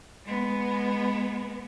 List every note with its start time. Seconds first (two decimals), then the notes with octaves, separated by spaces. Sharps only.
0.25 G#3 B3